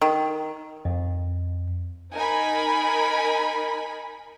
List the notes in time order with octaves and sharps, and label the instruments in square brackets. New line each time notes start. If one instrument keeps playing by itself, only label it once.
[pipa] D#3
[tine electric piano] F2
[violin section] D#4 A#4 G#5 B5